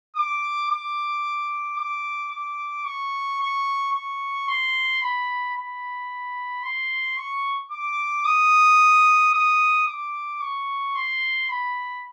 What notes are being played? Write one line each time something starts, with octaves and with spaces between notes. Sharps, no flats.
D6
D6
D6
D6
C#6
C#6
C#6
C6
B5
B5
C6
C#6
D6
D#6
D#6
D6
C#6
C6
B5